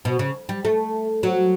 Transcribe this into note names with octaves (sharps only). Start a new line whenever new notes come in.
B2
C#3
G3
A3
F#3